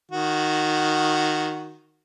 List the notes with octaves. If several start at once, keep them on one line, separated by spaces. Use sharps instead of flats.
D#3 F#4